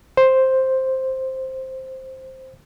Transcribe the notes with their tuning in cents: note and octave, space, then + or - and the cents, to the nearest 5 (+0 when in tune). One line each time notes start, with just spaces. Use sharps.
C5 +5